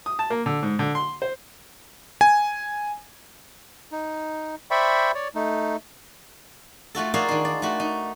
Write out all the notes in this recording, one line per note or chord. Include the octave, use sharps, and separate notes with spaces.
D#6
A5
A#3
D3
G#2
D3
C6
C5
G#5
D#4
C5 D5 E5 G5 B5 C#6
C#5 D5
A3 D#4
A3 F4 F#4 A4
F4 F#4 G#4 A#4 D5 F5
D#3 D4
D5
A3 F#4
D#4